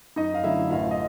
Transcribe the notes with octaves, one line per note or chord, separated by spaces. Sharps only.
F#2 D#4 D#5
F5
D3 F#3 A3 E4 E5
A1 F4 F5
D#5